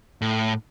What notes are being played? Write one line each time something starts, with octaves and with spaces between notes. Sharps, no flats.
A2